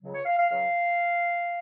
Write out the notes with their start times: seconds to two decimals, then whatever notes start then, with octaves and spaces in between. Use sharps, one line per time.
0.03 C#2 C#3 F#3
0.14 C#5
0.25 F5
0.38 F5
0.49 C#2 C#3 F#3 F5